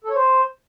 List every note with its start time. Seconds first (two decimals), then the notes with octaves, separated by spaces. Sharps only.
0.04 A4
0.10 C#5
0.15 C5